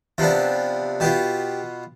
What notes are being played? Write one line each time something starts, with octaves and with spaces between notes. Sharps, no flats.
C3 F3 B3 D4 F4
B2 B3 F4 G4